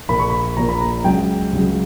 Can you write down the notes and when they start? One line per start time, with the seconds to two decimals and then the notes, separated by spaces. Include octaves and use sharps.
0.09 A#1 A#2 A#3 B5
0.19 C#6
0.30 B5
0.57 A#1 A#2 A#3 A#5
0.69 B5
0.81 A#5
1.04 C#2 C#3 F#3 G5
1.52 C#2 C#3 F#3